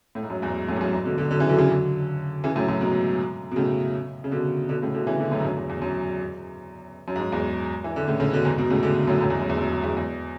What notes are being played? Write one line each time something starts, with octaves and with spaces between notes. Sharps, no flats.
A2
G#2
F#2
E2 G#2
F#2 A2
E2
F#2
E2 G#2
B2 D3
D3 F#3
D3 F#3
C#3 E3
D3 F#3
C#3 E3
D3 F#3
C#3 E3
F#2 A2
F#2 A2
G#2 B2
B2
A2 C#3
C#3
B2 D3
B2 D3
A2 C#3
B2 D3
C#3 E3
B2 D3
F#2 A2
G#2
F#2
E2
E2
F#2
F#2
G#2
F#2
E2 G#2
E3
D3
A2 C#3
A2 C#3
B2 D3
E2 G#2
G#2 B2
A2 C#3
B2 D3
F#2 A2
F#2 A2
E2 G#2
F#2
E2
F#2
F#2
E2 G#2
E2